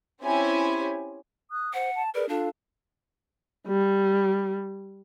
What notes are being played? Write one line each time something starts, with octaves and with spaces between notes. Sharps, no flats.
C4 C#4 E4 G4 C#5 G#5
D#6 F#6
C5 F#5
A5
G#4 A#4 B4 D5
D4 F4 A4 F5
G3